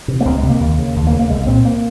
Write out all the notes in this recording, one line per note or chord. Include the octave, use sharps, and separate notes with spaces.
C3
A#3
C#2 C4
G#3
C3
A#3
D#2
C#3
D#2
A#3
C#3
A#3
C2 G#3
A#2 C4
A#3